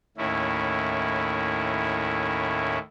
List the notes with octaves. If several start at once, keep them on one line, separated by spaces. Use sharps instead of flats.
D#2 A2 C#4 E4